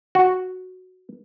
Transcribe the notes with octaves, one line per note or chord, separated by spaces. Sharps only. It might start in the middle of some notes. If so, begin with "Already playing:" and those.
F#4